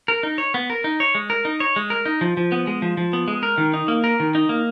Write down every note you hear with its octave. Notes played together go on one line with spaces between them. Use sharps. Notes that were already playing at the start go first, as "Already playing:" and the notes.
A#4
D#4
C#5
B3
A#4
D#4
C#5
G#3
A#4
D#4
C#5
G#3
A#4
D#4
F3
F3
B3
G#3
F3
F3
B3
G#3
A#4
D#3
D#4
A#3
A#4
D#3
D#4
A#3